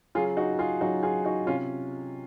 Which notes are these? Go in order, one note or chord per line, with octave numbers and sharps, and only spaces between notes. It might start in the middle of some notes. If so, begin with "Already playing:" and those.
C#3 F#3 F4 G#4
D#4 F#4
F4 G#4
C#3 F#3 D#4 F#4
F4 G#4
D#4 F#4
C3 C#4 F4